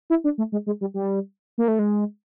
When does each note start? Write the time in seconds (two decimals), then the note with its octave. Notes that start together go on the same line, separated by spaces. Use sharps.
0.10 E4
0.24 D4
0.38 A3
0.52 G#3
0.66 G#3
0.81 G3
0.94 G3
1.58 A#3
1.68 A3
1.79 G#3